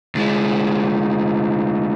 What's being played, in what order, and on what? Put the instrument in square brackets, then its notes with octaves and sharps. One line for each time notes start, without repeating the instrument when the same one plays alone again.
[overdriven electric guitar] D2 G#3